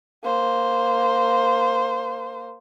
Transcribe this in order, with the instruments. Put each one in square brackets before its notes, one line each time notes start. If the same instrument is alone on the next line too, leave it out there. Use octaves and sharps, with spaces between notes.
[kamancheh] A#3 C5